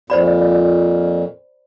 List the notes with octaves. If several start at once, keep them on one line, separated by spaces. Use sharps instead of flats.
F2 A#2 C5 D5 B5